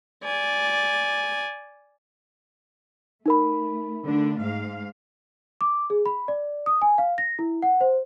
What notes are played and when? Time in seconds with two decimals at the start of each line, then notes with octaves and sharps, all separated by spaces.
0.24 D5 G#5
3.26 A3 D#4 A#4 B5
4.05 D3 A3 D4
4.41 G#2 F5
5.61 D6
5.90 G#4
6.06 B5
6.28 D5
6.66 D#6
6.82 G#5
6.98 F5
7.18 A#6
7.39 E4
7.62 F#5
7.81 C5